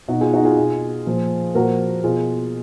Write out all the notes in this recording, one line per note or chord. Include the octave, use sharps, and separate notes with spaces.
B2 D#4 F#4
F4 G#4
D#4 F#4
F4 G#4
B2
A#2 F3
A#2 F3 F#4 A#4
B2 F4 G#4